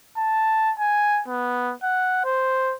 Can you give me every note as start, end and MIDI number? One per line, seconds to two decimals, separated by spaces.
0.18 0.73 81
0.79 1.22 80
1.28 1.74 59
1.83 2.23 78
2.25 2.74 72